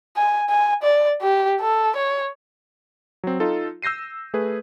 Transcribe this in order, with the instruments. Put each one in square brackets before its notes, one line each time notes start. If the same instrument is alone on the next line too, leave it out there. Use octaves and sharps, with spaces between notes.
[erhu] G#5
G#5
D5
G4
A4
C#5
[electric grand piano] F#3 C4
D#4 F4 A4
E6 G6 A#6 C7 D#7
A3 G#4 B4